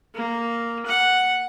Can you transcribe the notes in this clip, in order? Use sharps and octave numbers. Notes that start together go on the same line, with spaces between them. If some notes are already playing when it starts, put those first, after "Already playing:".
A#3
F#5